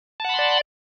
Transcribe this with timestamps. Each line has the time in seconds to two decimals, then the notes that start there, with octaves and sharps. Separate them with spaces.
0.20 A5
0.24 F#5
0.29 B5
0.34 C6
0.39 D5